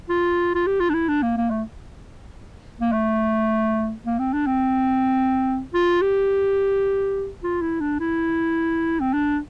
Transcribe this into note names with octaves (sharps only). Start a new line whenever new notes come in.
F4
F4
G4
F4
D4
E4
D4
A#3
A#3
A3
A#3
A3
A#3
C4
D4
C4
F4
G4
F4
E4
D4
E4
C4
D4